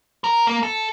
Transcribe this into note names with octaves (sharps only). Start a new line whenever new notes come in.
A#4
A#3
A4